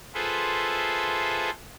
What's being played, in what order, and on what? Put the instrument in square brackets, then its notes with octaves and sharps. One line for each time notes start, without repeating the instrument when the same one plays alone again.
[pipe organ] F4 G#4 A4 B4 C5 E5